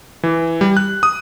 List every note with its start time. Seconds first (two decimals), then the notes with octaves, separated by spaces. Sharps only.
0.23 E3
0.61 G3
0.77 F#6
1.03 D#6